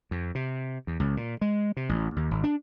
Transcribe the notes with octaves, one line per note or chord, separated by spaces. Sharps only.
F2
C3
E2
C#2
A#2
G#3
C3
A1
D#2
G#1
D4